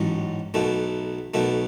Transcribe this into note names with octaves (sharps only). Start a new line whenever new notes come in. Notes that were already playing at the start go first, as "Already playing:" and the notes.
Already playing: A1 G#2 F#3 C#4
B1 B2 A3
B1 B2 A3